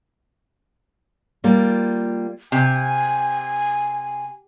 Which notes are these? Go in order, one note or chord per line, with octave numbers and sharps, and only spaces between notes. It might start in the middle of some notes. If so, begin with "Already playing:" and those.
G3 A#3 F4
C3 G#5